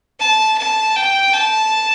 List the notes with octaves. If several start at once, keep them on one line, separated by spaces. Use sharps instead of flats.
A5
A5
G5
A5